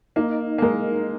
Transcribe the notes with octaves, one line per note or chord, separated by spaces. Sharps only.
A#3 D#4
A#3
G#3 A#4